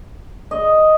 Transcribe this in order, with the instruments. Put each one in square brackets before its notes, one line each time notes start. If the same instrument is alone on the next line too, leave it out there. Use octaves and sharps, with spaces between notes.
[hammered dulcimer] D#5